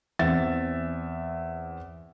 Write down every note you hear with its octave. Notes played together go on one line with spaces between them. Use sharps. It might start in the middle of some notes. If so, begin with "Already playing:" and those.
E2 C4 E5 A6